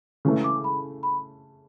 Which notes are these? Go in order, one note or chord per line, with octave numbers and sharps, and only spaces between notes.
C#3 E3 A3
D6
B5
B5